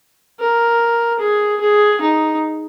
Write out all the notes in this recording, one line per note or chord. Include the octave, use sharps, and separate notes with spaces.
A#4
G#4
G#4
D#4